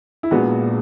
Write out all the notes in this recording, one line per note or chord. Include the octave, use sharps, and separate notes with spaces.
E4
A#1 A#2 G#3 B3 F#4